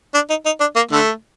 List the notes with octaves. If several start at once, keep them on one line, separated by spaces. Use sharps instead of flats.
D4
D#4
D#4
D4
A#3
D3 A3